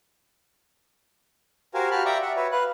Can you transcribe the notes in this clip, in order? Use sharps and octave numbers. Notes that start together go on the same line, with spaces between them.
F#4 G4 A#4 C5 F5 G#5
F#4 G4 F5 A5 B5 F6
D5 E5 G5 A#5 C#6 D6
E5 F#5
F#4 B4 C#5 E5
B4 F5 F#6